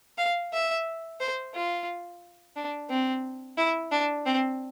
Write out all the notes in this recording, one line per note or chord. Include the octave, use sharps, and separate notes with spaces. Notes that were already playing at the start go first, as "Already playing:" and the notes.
F5
E5
C5
F4
D4
C4
E4
D4
C4